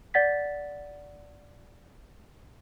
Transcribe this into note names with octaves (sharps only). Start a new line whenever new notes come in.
D5 F#5 A6 B6